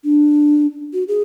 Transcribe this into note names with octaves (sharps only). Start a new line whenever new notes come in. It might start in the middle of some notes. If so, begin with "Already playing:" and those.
D4
F#4
G#4